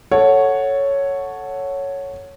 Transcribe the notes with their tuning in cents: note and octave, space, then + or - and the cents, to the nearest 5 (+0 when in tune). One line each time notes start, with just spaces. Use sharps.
A4 +0 C#5 +0 F#5 -5